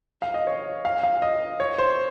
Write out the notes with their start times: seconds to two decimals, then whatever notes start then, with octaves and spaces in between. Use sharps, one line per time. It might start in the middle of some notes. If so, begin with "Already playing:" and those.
0.22 F5
0.34 D#5
0.47 C#5
0.85 F5
1.03 F5
1.22 D#5
1.60 C#5
1.78 C5